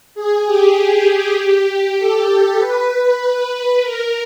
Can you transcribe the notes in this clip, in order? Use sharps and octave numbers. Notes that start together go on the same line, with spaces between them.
G#4
G4
G4
A4
B4
A#4